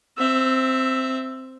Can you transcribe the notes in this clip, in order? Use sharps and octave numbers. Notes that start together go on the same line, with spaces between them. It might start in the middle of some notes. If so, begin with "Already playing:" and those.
C4 E5